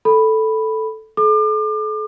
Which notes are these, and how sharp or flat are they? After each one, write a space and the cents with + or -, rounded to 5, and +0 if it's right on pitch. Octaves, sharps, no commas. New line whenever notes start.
A4 +0 B5 +0
A4 -40 D6 +35